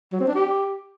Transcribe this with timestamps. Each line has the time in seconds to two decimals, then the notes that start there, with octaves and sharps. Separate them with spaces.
0.13 F#3
0.20 C4
0.28 D4
0.35 G4